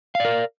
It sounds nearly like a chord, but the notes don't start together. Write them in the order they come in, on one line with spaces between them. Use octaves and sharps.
F5 D5 A#4